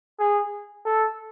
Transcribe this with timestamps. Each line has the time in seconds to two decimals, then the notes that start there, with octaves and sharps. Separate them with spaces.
0.19 G#4
0.85 A4